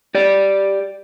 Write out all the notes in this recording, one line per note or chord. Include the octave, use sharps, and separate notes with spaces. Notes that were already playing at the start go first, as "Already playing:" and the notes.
G4 D5